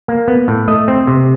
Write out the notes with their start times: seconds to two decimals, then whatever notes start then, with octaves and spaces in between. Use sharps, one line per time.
0.08 A#3
0.28 B3
0.48 A2
0.68 A3 D#5
0.88 C4
1.07 C3